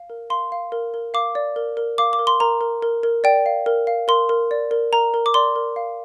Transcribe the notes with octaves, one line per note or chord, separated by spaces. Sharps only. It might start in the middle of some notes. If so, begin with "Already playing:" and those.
Already playing: F5
A#4
F5 C6
F5
A#4
A#4
F5 D6
D5
A#4
A#4
F5 D6
D6
A#4
C6
A#4 A#5
A#4
A#4
A#4
D5 G5
F5
A#4
F5
A#4 C6
A#4
D5
A#4
A#4 A#5
A#4
D6
D5 C6
A#4
F5